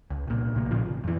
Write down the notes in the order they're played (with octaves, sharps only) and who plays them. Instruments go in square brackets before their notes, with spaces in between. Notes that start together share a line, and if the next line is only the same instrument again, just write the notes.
[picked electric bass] C#2
C2 A#2
A#1 C3 A#3
A#2 C#3 F3
G#1
F2 E3